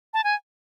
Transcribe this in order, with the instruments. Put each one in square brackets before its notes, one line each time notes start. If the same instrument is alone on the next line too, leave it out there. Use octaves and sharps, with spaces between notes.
[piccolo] A5
G#5